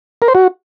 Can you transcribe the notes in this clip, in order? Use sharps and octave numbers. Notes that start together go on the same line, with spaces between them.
A#4
C5
F#4